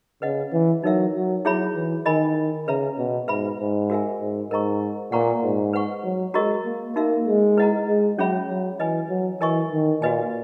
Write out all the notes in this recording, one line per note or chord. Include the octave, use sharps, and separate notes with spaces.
C#3 B4 D#5 F#5
E3
F#3 D#4 A#4 E5
F#3
F#3 E4 G#4 C#5 E5 B5
E3
D#3 A#4 D#5 G#5 B5
C#3 B4 E5 A#5
B2
G#2 B4 E5 B5
G#2
F#4 A#4 E5 G#5
G#2
G#2 A#4 D#5 A#5 C#6
A#2 B4 F#5 A#5 C#6
G#2
B4 F#5 C#6
F#3
G#3 F#4 A#4 D#5 A#5 C#6
A#3
A#3 D#4 F#4 A#4 E5
G#3
E4 B4 D#5 F#5 A#5
G#3
F#3 C#4 G#4 C#5 E5 B5
F#3
E3 B4 D#5 G#5
F#3
E3 A#4 D#5 G#5 C#6
D#3
A#2 F#4 B4 D#5 G#5